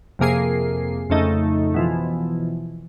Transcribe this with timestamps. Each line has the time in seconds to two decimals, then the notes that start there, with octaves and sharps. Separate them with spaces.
0.19 F2 C3 A#3 G#4 C7
1.10 F2 C#3 A3 D#4
1.74 B2 E3 F3